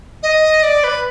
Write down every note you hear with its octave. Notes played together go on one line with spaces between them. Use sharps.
D#5
D5
B4